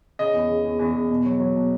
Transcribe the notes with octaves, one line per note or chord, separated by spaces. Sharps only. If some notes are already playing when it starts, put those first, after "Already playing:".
C#3 D#5
E2
C#3
E2
E2
E2
B2
F#3
F#3
B2